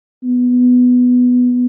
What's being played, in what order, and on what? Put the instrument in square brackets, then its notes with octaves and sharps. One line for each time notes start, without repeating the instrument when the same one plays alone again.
[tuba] B3